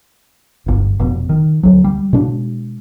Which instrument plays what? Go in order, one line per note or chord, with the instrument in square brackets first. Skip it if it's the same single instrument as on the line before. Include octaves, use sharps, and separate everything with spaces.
[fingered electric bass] D1 G1
F1 B2
D#3
D2 F#3
G3
B2 G#3 D4